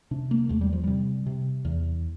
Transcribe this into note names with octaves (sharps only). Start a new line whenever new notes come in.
C3 D4
A#3
E2 A3
G3
F3
C3 G3
C3
E2